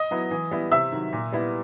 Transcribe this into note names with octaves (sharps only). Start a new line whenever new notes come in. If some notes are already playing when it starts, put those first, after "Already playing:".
Already playing: D#5 D#6
F#3 B3 E4
E3
G3 B3 E4
C3 E5 E6
D#3 F#3
A#2
G3 B3 E4